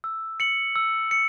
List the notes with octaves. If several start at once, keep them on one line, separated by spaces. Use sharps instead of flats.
E6
C#7 F#7
E6
C#7